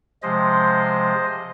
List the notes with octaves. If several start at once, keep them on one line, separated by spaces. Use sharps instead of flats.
C3 F3 G#3 C5 D#5